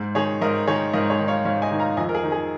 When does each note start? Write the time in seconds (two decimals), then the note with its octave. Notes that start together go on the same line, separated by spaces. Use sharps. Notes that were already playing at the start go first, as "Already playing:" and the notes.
Already playing: G#2
0.15 D#3 G#4 C#5
0.41 G#2 A#4 D#5
0.67 D#3 G#4 C#5
0.93 G#2 A#4 D#5
1.10 G#4 C#5
1.19 D#3
1.28 C#5 F5
1.45 G#2 C#5 F5
1.62 D#5 G#5
1.71 D#3
1.79 F5 A#5
1.97 F2 D#5 G#5
2.09 A#4
2.14 G#4
2.23 D#3
2.32 G#4